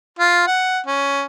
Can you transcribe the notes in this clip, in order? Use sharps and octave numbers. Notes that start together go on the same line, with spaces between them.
F4
F#5
C#4